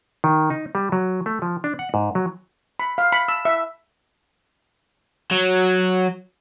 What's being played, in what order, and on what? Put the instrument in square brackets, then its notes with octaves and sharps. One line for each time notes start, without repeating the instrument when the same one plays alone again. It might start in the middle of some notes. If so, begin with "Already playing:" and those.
[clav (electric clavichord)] D#3
D#4
G3
F#3
A3
F3
D4
F#5
G#2
F#3
[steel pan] B5
F5
B5
E6
E5
[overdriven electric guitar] F#3